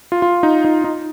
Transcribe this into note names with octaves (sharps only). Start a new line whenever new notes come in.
F4
F4
D#4
D#4
D#4